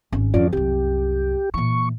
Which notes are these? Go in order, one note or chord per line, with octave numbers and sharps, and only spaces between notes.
G#1 C#4
F2 D3 C#4 F4 D5
C2 F#2 G4
A#2 E3 C#6